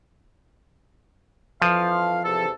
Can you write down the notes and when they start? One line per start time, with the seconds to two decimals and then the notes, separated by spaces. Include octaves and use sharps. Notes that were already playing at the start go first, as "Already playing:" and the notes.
1.62 F2 E3 F3 F5
2.25 E2 C3 A4